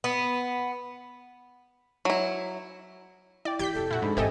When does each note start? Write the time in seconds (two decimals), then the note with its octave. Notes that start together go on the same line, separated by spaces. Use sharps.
0.04 B3
2.05 F#3 E4
3.45 E4 D5 G5
3.59 E3 G4 G6 B6
3.74 F1 F3 A4
3.91 A#2 E4 F#4
4.02 G#2 D4 B5
4.17 G#1 E3 G4 A4 C5 D#5 E5 G#5